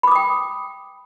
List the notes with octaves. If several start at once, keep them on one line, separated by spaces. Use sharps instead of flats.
G5 B5 D6 D#6